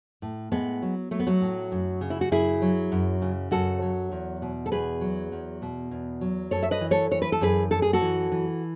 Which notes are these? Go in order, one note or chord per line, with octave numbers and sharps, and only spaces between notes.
A2
A2 G#3 B3
F#3
F#3 A3
B3
F#3 A3
A2
F#2
C#3
E4
F#4
F#2 E4 G#4
F#3
F#2
C#3
F#2 F#4 A4
F#3
E2
B2
A4
E2 G#4 B4
F#3
E2
B2
E2
F#3
F#2 A4 C#5
E5
B4 D#5
E3
A4 C#5
E3 C#5
B4
A4
F#2 G#4 B4
F#2 A4
G#4
F#4 A4
E3
E3